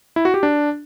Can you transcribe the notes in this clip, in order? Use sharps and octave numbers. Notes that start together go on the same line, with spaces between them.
E4
F#4
G4
D4